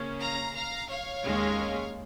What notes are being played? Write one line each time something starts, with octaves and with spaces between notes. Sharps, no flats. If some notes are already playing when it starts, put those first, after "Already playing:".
Already playing: C#3 A#3 C#4
F5 A#5
F5 A#5
C#5 F5
D#2 D#3 G#3 C#4